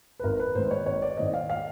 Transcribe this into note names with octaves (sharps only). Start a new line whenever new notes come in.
B4
G#1 A#4
B4
G#2 D#3 G#3 C4 C5
C5
C#5
G#1 C#5
D5
G#2 D#3 G#3 C4 D#5
F5
F5